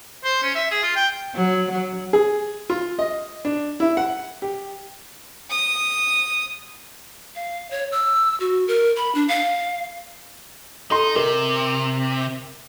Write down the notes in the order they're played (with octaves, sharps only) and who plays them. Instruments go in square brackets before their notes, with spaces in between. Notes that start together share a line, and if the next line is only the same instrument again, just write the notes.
[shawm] C5
C#4
E5
G#4
F4
G5
[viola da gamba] F#3
F#3
[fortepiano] G#4
F4
D#5
D4
E4
F#5
G4
[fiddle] D#6
[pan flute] F5
C#5
E6
F#4
A#4
B5
D4
F5
[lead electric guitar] D#4 [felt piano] A4 C6
[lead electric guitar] C3 [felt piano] A#4